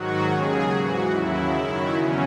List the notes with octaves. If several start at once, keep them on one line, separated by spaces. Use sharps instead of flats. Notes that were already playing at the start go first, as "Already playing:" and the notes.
Already playing: G#2 D#3 F#3 F#4
D#2 C#3 F#3 G#4
G#2 E3 F#4
D#2 C#3 F#3 E4
F#2 D#3 F#3
E2 C#3 F#3 C#4